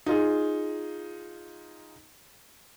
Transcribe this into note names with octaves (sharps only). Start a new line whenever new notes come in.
D#4 F4 G#4